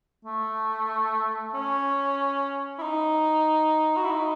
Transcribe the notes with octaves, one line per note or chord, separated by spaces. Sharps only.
A3
C#4
E4
D#4
F#4
E4
D#4